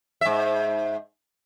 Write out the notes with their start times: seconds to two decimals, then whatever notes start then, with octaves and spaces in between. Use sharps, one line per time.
0.21 G#2 E5